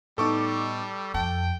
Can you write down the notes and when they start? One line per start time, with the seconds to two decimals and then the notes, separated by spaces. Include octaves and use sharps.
0.18 A2 G3 B3 D#4 A4 C#6 D6
1.14 F2 G5 A5